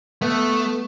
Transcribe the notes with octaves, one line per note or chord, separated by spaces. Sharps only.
A3 B3